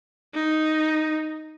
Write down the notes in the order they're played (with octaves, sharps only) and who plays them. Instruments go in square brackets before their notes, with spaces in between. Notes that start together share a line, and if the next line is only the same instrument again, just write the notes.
[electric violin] D#4